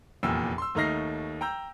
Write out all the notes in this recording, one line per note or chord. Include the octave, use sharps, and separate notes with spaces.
F1 E2 A#2 G5 E6
C6 E6
D#2 A3 D#4 F6 A#6 C7
G5 A#5 E6 G6